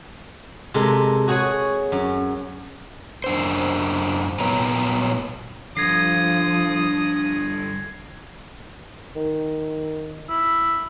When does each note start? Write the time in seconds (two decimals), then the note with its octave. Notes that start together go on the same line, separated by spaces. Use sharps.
0.74 C3 G#3 A4 A#4
1.28 F#4 G#4 C#5 F#5 G#5
1.92 F#2
3.24 F#2 D4 C5
4.40 A#2 B3 B4 C#5 A#5
5.77 G2 D3 F3 D#6 G#6 A#6 C7
9.16 D#3
10.29 E4